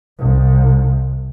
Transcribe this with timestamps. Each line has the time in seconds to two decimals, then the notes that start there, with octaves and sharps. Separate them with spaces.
0.19 C2